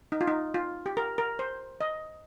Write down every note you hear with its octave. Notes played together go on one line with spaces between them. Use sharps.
D#4
F4
D#4
F4
G4
A#4
A#4
C5
D#5